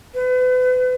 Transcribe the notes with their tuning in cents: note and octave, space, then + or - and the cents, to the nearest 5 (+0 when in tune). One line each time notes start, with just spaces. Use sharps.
B4 +35